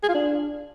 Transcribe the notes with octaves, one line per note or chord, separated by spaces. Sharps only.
G#4
F4
D4